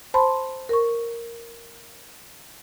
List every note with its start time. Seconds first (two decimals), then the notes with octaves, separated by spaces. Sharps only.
0.14 C5 A5 B5 C6
0.69 A#4 C#6